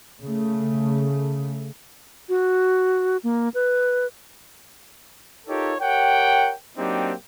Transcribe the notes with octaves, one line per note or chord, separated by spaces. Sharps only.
C#3 A3
F#4
A#3
B4
D#4 F4 G4 A4 A#4 C#5
G4 A#4 C#5 F#5 G5
F#3 A#3 C4 D4 D#4 G4